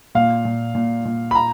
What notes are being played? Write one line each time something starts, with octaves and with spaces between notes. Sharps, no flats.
A#2 F5
A#2
A#2
A#2
B5
A#5